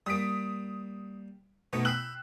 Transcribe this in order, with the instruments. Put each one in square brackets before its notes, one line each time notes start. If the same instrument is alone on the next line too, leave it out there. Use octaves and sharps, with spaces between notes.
[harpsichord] G3 A#3 [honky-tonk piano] D#6 B6 D7
[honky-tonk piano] B2 [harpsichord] A3 B3 D#4
[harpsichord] G5 B5 C6 [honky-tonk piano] E6 F#6 F#7